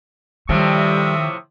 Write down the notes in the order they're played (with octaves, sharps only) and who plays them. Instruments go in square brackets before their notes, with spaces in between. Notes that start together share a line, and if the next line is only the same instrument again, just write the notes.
[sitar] A2 C3 F3 [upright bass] D#3 [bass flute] G3 [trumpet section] E5 C#6 D#6